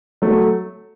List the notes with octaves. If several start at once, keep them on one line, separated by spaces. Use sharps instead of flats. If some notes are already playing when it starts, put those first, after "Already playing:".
F#3 A3